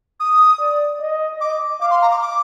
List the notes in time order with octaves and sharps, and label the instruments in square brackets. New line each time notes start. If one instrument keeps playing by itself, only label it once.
[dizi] D#6
[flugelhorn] D5
D#5
[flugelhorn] D#5 [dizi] D6
[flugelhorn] F5 [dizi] D6
[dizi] C6
A#5
D6
D6